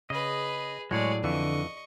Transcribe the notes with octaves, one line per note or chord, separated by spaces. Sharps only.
C#3 G#4 B4 D#5
A2 F#3 G#3 G#4 C#5 D5
F2 D3 E3 D#5 C#6